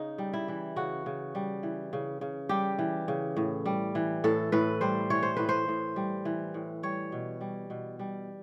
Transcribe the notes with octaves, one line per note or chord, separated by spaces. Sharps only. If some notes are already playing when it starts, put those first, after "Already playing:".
Already playing: C#3 D#4
G3
E4
E3
C#3 F#4
C#3
G3
E3
C#3
C#3
G3 G4
E3
C#3
A2
G3
E3
A2 A4
A2 B4
G3 C5
E3 C#5
C5
A2 B4
C5
A2
G3
E3
A2
G3 C#5
B2
G3
B2
G3